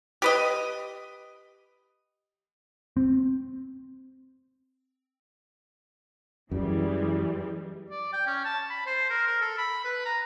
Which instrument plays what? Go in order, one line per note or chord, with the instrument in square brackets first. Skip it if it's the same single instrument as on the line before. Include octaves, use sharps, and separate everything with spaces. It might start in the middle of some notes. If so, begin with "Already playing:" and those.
[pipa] G4 B4 D#5
[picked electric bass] C4
[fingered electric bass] F#2 [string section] E3 G3 G#3
[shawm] D5
G5
C#4
A5
B5
C5
A#4
A#4
A4
B5
B4
A#5